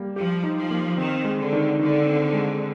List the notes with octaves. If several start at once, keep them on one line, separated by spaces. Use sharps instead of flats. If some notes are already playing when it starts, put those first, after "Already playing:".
Already playing: G3 A#3
F3 G4
D#4
F3
A#3
D#3 C4
G#3
D3
D#3
D3 D#3
C4
G#3